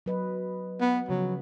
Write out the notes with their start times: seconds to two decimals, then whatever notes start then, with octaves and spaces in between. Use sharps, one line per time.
0.06 F#3 B4 D#5
0.81 B3
1.09 C#3 F3 F#3